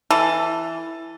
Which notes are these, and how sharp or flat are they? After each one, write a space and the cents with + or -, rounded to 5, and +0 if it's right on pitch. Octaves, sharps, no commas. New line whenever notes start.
E3 +0 A4 +10